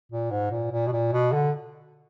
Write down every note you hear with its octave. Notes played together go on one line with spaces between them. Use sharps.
A#2
G#2
A#2
A#2
B2
A#2
B2
D3